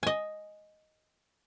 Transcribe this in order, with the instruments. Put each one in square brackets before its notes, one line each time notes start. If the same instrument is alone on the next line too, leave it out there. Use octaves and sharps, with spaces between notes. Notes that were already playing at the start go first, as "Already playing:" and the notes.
[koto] D#5 G#5